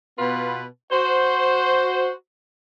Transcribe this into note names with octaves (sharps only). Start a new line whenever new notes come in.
B2 B3 F4 B4
F#4 C5